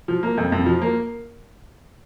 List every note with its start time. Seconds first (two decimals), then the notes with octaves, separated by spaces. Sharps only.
0.08 F3
0.23 A#3
0.37 F2
0.52 F2
0.66 F3
0.82 A#3